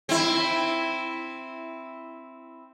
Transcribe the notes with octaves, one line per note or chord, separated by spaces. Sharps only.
C4 E4